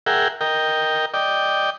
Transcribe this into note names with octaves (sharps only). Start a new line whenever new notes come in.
G#4 A#4 E5 F#5 G5
A#4 D#5 G5
D5 D#5 G5